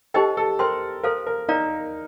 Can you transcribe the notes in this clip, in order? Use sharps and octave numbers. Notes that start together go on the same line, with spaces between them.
D#4 G4 A4 C5 D#5 G5
A4
A#4 C5 G5 C6
A4 A#4 C5 F5
A#4
D#4 A#4 D5 F5 A#5